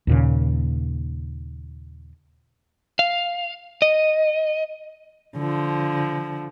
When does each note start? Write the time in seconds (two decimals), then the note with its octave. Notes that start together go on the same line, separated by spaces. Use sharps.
0.07 D#2 A#2 C#3
2.99 F5
3.82 D#5
5.37 D3 F3